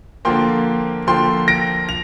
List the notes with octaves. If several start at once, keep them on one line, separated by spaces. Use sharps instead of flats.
D3 F3 A#3 G5 C6
D3 F3 A#3 G5 C6
A#6 D7
F7